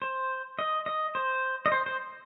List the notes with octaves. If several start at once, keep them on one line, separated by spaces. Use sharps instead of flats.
C5
D#5
D#5
C5
D#5
C5
C5